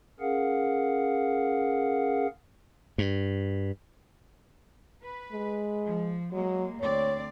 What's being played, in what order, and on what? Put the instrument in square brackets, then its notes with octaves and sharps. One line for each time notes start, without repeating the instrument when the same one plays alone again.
[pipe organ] C#4 G#4 A#4 F5 F#5
[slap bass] G2
[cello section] B4
[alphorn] G#3
[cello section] F3
[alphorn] F#3 [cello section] G#3 A#3
[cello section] D2 C4 D5 [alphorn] C#5